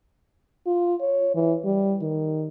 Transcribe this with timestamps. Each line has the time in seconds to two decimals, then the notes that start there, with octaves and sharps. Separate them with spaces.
0.66 F4
1.01 C#5
1.35 E3
1.65 G3
2.01 D#3